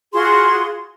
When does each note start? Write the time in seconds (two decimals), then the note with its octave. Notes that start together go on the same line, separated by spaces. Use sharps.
0.13 F4 F#4 G#4 C6